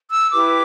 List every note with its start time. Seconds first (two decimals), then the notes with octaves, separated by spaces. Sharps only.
0.11 E6
0.32 E4 G4 B4 D6